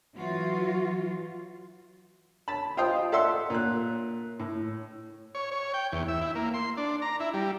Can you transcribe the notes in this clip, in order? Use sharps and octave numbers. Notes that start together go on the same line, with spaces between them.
E3 F#3 F4 F#4
A5 B5
F4 C5 D#5 F5 G5 D#6
A4 D5 E5 F#5 C6 E6
A#2 F#6
A2
C#5
C#5
G5
E2
E5
E4
A#3
C6
D4
A#5
E4
G3